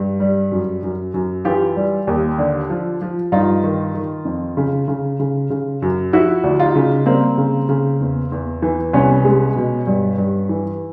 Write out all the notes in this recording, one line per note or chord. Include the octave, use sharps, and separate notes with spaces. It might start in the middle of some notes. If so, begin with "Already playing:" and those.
Already playing: G2
G3
F#2
F#2
F#2
E3 F4 G4
G3
D#2
D3
F3
F3
G2 D#4 F4
D#3
D#3
F2
C#3
C#3
C#3
C#3
F#2
F3 E4 F#4
D2
D#4 F4
C#3
G3 A#3 C4
C#3
C#3
E2
E2
E3
C2 B3 C#4
G#3
B2
G2
G2
E3